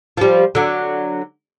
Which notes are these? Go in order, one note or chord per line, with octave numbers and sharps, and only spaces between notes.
F3 G3
D3 F#3